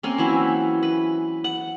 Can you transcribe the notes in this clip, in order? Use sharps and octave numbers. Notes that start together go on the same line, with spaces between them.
A#3 C4 C#4
E3 F#3 E4
B4
F#5